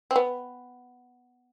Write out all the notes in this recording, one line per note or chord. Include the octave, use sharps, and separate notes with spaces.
C4
B3